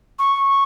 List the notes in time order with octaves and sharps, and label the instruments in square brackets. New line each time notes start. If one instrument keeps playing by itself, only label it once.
[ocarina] C#6